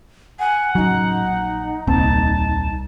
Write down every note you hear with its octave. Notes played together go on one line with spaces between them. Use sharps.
F#5 G#5
A1 C#3 F#3 D#4
A#1
D#1 C2 A#3 C4 A5